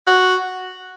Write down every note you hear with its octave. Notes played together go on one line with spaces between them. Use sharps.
F#4